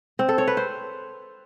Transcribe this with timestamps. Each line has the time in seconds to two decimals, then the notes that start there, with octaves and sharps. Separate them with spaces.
0.19 C4
0.29 A4
0.38 C#5
0.48 B4
0.57 C5